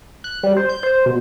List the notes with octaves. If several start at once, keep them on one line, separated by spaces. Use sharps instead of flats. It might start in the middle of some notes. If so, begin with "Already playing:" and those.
F#6
G3
C5
G6
C5
B2